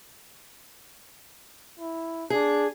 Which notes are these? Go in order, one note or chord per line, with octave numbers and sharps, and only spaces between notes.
E4
D4 G#4